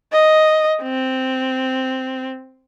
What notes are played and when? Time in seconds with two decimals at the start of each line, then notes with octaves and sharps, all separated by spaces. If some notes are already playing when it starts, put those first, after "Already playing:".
0.12 D#5
0.82 C4